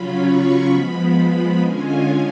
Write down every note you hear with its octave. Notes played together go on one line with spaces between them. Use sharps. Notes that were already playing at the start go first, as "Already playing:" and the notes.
Already playing: C#3 F#3 C#4 F4 B5
C#6
F3 G#3 B3 B5
D3 G#3 C#4 F4 G#5